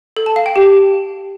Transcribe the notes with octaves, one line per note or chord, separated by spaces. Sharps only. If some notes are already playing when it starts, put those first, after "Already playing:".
A4
A5
F5
G5
G4